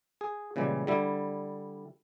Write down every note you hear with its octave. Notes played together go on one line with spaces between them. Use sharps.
G#4
A#2 C#3 E3 G3 G#3
D3 G3 E4